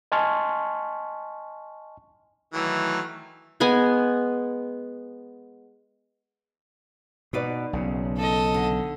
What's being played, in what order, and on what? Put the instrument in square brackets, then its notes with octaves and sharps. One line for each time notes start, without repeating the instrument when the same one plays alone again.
[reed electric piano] D#5 G#5 A5 C6 C#6 F6
[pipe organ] D#3 F#3 A3 [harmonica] E3
[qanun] G#3 B3 G#5
[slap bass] B2 [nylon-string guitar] D#4 B4 D5
[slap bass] B1 C#3
[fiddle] A4 D#5
[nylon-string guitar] D3